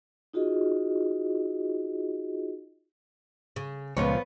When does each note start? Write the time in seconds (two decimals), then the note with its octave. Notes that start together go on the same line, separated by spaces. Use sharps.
0.34 D#4 F4 F#4 G#4 D#5
3.56 C#3
3.97 C#2 A#2 F3 B3 C#5